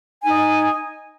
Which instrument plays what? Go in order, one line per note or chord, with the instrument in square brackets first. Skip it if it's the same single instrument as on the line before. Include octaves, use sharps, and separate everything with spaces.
[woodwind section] G#5
D#4
D#5